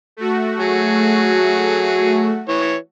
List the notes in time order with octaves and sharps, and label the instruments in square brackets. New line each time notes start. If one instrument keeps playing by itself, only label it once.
[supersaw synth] A3 F#4
[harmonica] F#3 G#4
E3 C#5